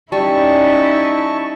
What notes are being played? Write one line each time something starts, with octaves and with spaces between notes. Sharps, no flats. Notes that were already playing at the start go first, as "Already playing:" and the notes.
G3 C#4 D#4 E4 A5 C#6